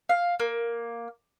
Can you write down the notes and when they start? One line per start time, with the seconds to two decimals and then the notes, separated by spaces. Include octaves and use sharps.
0.09 F5
0.40 A#3